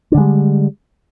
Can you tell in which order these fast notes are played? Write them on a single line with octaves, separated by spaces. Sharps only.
D4 D3 G#3 G3